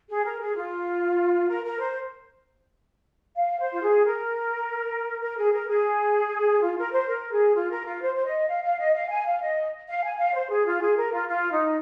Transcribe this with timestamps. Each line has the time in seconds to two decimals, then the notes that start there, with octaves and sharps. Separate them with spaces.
0.10 G#4
0.25 A#4
0.41 G#4
0.55 F4
1.49 A#4
1.65 A#4
1.80 C5
3.36 F5
3.59 C5
3.73 F4
3.82 G#4
4.05 A#4
5.22 A#4
5.38 G#4
5.53 A#4
5.68 G#4
6.62 F4
6.77 A#4
6.92 C5
7.08 A#4
7.31 G#4
7.55 F4
7.70 A#4
7.86 F4
8.02 C5
8.16 C5
8.25 D#5
8.48 F5
8.64 F5
8.79 D#5
8.95 F5
9.10 G#5
9.26 F5
9.42 D#5
9.89 F5
10.04 G#5
10.19 F5
10.35 C5
10.50 G#4
10.66 F4
10.81 G#4
10.97 A#4
11.13 F4
11.28 F4
11.51 D#4